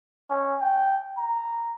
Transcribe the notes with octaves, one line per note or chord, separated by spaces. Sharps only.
C#4
G5
A#5